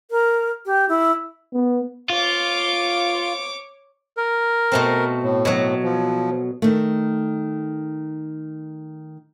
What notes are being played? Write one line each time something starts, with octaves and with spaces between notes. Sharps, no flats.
A#4
G4
E4
B3
F4 C#5 D6
A#4
B2 A3 C4
A2
B2 F#3
F3
D#3 A3